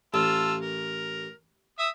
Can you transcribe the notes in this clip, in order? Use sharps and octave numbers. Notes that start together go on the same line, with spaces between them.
A1 F4 A5 E6
A#4
E5 D#6 E6